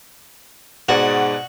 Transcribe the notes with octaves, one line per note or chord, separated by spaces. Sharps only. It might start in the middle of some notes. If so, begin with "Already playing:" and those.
G#2 B2 F#4 D5 F#5